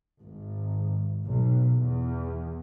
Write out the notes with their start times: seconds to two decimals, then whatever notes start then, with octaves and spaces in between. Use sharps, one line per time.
0.19 G#1
1.25 B1
1.76 E2